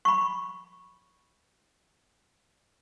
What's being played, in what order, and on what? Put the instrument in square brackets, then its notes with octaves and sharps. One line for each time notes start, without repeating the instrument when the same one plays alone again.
[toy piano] B5 C#6